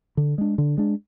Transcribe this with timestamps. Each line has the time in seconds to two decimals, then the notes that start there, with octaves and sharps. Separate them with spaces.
0.17 D3
0.38 G#3 D4
0.58 D3
0.78 G#3 D4